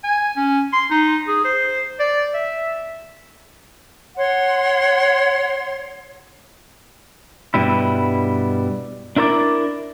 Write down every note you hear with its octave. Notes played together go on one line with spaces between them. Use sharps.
G#5
C#4
C6
D#4
G#4
C5
D5
E5
C#5 F#5 C6
G2 B2 G3 E4
D4 E4 A#4 C5 D5